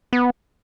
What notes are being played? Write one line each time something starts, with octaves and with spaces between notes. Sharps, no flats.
B3